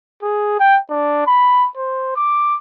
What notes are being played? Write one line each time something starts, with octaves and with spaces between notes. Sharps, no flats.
G#4
G5
D4
B5
C5
D6